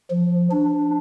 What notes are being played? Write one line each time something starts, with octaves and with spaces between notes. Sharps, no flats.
F3
D4